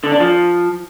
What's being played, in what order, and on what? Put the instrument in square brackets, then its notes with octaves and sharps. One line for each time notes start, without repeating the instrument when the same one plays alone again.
[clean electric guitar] D3
D4
F3